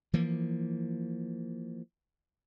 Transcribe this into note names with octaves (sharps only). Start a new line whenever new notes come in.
E3 F3 A#3